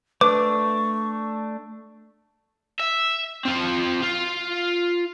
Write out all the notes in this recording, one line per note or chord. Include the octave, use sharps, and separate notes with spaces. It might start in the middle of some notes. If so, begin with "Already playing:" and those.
A3 D4 B4 C#6 D6
E5
C4 F4
F4